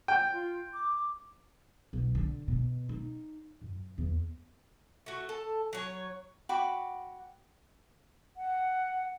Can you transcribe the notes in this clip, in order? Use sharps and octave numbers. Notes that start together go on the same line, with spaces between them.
G5
F4
D6
B1
D3
B2
D#4
F#2
E2
A3 F#4
A4 A5
F#3 C#5
F#4 G5 B5 D6
F#5